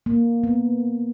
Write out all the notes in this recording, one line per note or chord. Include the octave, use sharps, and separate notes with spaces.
A#3
B3